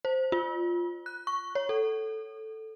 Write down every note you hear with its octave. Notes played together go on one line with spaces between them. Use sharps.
C5
F4
F#6
C#6
C#5
A4